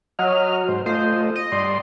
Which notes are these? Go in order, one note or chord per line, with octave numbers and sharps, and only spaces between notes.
F#3 D#5 F6
G#2 C5
A3 F4 C5 D#5
D#5
G2 D5 C6